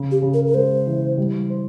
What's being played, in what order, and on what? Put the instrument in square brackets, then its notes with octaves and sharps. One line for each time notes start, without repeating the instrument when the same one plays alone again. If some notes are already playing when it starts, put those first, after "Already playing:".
Already playing: [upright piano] C#3
[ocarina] G4
[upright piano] C#3
[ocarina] A#4
A#4
[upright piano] G#3 [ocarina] C5
[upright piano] E3
G3
C5